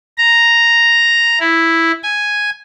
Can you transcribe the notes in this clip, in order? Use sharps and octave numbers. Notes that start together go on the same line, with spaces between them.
A#5
E4
G#5